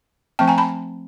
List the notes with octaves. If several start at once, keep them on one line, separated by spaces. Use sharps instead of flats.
F3 A3 C4 G5 A5
G#5 A#5
A5 B5